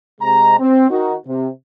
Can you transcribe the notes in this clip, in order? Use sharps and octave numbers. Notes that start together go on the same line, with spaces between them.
C3 G#3 A#5
C4
D#3 D#4 F#4
C3